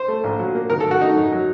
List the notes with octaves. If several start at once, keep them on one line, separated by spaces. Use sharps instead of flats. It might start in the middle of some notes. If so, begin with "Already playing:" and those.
Already playing: C5
A3
A#1
F#3
A#3
D#3 A#4
A4
A3
F#4
A3 D#4
F#2
F#3